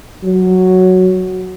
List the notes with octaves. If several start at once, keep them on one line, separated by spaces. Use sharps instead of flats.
F#3